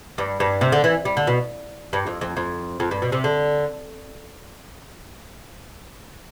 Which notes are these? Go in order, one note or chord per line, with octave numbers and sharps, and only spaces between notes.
G2
G2
C3
D3
E3
G3
D3
B2
G2
F2
F2
F2
F2
G2
B2
C3
D3